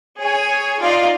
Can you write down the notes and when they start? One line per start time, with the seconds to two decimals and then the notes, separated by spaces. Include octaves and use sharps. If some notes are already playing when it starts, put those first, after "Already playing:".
0.19 G#4 C#5 G#5
0.81 D#4 F4 D5 F5